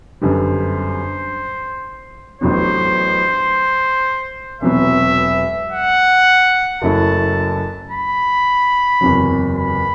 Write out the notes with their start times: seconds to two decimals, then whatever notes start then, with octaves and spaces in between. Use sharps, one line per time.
0.21 G1 F#2 D3 G3 C5
2.41 A1 A2 F#3 B3 D4 C5
4.61 E1 E2 C3 F#3 B3 E5
5.72 F#5
6.81 F#1 F#2 F#3 A3 E4 A5
7.91 B5
9.01 F#1 E2 C3 F#3
9.57 B5